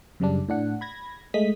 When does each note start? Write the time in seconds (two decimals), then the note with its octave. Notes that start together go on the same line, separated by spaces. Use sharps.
0.20 F#2 C#3 G3 D4
0.48 A2 D4 F#5
0.81 B5 G#6 A#6
1.34 G#3 A3 D#5 D#6 B6